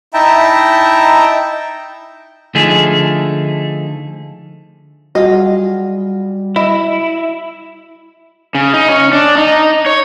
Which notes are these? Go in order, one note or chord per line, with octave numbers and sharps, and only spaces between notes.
D#4 E4 E5 G5 A5 A#5
D3 F3 A3 D#4 G#4
G3 F4 F#4 G#4 D#5
E4 D#5
C#3
D#4
C#4
D4
D#4
C#5